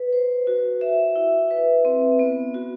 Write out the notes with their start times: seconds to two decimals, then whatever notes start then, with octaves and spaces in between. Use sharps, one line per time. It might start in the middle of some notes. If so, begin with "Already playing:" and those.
Already playing: B4
0.13 C5
0.47 F#4
0.81 E5
1.16 E4
1.51 B4
1.85 C4
2.19 B3
2.54 F#4